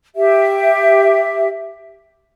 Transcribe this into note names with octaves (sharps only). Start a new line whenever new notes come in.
G4 E5